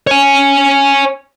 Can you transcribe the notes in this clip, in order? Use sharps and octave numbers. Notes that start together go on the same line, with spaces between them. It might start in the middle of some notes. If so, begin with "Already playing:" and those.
C#5 G#5